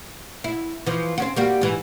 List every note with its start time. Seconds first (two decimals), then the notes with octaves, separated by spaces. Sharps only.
0.44 E4
0.86 E3 F3
1.18 C4 C#4 F#4
1.36 G3 A#3 F#4
1.61 G#2 E3